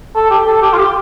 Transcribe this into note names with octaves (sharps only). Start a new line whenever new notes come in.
A4
G4
A4
G4
F4
G4